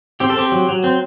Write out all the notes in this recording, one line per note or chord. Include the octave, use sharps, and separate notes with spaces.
C4 G4
A4
C4 G4
F#3
F#3
C4